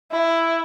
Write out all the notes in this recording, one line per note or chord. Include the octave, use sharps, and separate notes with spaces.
E4